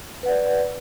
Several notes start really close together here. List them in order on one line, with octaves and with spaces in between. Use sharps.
B4 F#5 D5